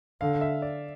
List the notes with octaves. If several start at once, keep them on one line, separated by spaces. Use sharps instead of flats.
D3 F5
E5
D5